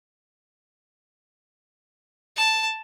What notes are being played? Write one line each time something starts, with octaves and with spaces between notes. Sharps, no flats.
A5